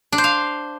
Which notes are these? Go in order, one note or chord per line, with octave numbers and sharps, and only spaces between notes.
D4
C5
F5